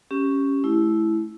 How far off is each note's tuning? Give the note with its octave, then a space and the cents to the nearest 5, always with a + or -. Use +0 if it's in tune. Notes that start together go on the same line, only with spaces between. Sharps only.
C#4 +0 G4 +0
A3 -35 E4 +0